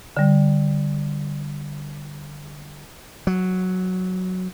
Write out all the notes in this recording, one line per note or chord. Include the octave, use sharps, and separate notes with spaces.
D3 G3
F#3